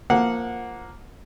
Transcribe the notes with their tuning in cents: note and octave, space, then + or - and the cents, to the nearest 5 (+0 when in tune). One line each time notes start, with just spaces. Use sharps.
F3 +0 A#3 +0 F#5 -20